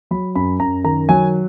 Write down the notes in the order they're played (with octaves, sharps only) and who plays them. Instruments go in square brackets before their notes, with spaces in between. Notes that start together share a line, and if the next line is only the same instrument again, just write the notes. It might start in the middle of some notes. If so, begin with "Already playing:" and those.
[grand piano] F#3 B5
F#2 B5
F#2 A#5
D#3 A#5
F#3 G#5